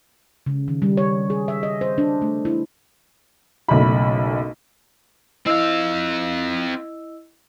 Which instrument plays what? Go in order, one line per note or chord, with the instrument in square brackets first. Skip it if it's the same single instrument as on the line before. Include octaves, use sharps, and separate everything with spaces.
[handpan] C#3
D#3
G3
C#5
G#4
E5
D#5
C5
D4
A3
E4
[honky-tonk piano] F#1 B1 A3 B5
[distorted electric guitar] C4 F5 [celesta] E4 D#5 E6